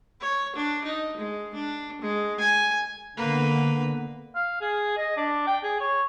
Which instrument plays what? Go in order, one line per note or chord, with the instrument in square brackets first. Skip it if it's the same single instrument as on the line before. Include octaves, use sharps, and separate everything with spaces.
[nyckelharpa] C#5
D4
D#4
G#3
D4
G#3
G#5
[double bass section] D3 B3 [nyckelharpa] A#3 B4
[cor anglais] F5
G#4
D#5
D4
G5
G#4
C#5